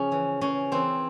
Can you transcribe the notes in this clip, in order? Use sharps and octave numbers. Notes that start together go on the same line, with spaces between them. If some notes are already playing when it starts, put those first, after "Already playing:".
Already playing: C#3 F3 C#4
E3
C#3 C#4
E3 C4